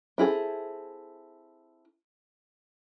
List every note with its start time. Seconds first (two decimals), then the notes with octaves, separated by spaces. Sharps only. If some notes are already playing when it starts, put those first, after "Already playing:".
0.18 C4 E4 G#4 A4